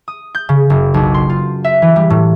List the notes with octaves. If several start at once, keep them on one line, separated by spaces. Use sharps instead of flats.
D#6
G6
C#3
F#1
B1
C6
F4
E5
E3
G3
A2